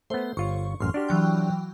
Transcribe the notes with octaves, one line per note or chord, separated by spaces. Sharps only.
A3 B3 C5
G1 F4 C#5 C#6
A1 F#2 C6 F6
D4 F#4 G4
E3 F#3 G5